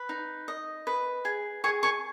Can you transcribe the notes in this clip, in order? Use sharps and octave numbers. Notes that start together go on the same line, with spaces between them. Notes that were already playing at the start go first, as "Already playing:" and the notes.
Already playing: B4
D#4
D#5
B4
G#4
G#4 G#5 C#6
G#5 C#6